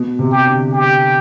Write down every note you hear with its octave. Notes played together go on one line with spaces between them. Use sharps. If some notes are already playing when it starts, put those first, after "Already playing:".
Already playing: B2
C3
G4
D3
G4